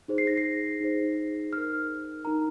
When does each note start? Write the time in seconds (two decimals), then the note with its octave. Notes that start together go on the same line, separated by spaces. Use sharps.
0.08 D#4 G#4 C5
0.18 C7
0.27 A#6
0.37 C7
0.80 D#4 G#4 C5
1.53 D#4 A#4 F6
2.25 D#4 A#4 A#5